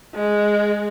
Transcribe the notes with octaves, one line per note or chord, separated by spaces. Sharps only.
G#3